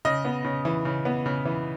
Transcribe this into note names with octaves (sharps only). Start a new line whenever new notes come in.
C#3 D#5
B3
C#3
E3
C#3
B3
C#3
E3